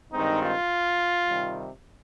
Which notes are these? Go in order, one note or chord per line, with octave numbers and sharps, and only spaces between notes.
G2 D#3 G#3 C4 D#4
F4
C3 D#3 G3